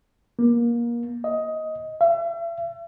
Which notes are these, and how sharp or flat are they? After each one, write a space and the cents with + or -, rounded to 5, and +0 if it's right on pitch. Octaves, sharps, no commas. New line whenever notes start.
A#3 +25
D#5 +15
E5 +40